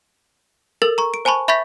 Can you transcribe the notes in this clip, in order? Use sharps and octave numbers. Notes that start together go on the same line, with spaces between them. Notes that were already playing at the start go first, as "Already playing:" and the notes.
A4 A#4 E6 A6
A#5 C#6
D7
C5 G#5 A5 B5 C#6
E5 B5 C#6 G6 A6 B6